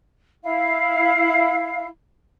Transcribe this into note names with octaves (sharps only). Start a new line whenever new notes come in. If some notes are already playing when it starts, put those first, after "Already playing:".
E4 F5